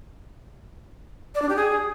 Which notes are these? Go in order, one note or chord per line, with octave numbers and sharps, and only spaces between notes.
D5
D4
G4
G#4